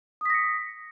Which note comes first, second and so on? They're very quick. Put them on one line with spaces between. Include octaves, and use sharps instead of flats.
D#6 B6 A#6 C#7